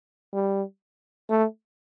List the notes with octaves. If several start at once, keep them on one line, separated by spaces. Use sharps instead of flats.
G3
A3